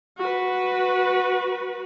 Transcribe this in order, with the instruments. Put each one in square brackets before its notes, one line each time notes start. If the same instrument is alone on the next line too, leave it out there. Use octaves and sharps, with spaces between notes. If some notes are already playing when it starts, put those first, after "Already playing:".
[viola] F#4 B4